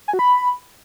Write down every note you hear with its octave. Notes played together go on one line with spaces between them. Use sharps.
G#5
F#4
B5